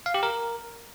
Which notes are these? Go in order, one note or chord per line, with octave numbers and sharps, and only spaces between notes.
F5
G4
A#4